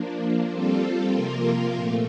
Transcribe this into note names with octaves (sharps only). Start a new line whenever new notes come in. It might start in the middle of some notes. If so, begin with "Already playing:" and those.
Already playing: F3 A#3 D4
G3 C4 F4 A4
C3 F3 A#3 F4 A#4
A#2 A3